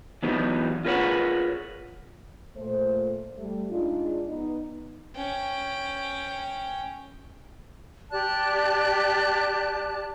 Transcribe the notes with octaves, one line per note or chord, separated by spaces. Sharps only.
E3 F#3 B3 D#4 G4
F4 G#4 A#4 B4 C#5 F#5
A#2 A3 C5
G3 A3
G#3 D4 D#4 F4
B3 D#4
C#4 G5
G4 D5 A5 F#6